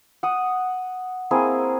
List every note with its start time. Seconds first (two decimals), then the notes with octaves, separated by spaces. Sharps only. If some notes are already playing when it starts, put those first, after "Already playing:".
0.23 F#5 D#6
1.31 A#3 C4 E4 G#4